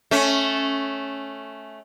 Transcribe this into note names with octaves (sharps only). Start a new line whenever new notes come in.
A3 C#4